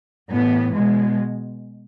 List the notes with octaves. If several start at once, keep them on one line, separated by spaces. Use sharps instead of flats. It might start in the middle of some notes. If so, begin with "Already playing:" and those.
A2 E3 B3
B2 G#3